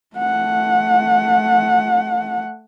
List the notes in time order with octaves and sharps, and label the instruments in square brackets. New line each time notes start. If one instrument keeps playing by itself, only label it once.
[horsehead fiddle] A3 F#5